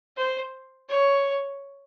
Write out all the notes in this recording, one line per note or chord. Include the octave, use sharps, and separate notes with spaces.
C5
C#5